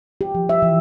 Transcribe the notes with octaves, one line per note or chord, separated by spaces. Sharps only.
G4
F3
E5
E3